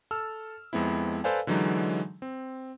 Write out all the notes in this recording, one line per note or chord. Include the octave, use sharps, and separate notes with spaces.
A4 A5 E6 F6
F2 G#3 B3 C4 E4
A4 B4 C5 D5 F5 G#5
D3 E3 F#3 G#3 D#4
C4